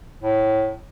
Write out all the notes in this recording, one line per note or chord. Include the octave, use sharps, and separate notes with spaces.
A2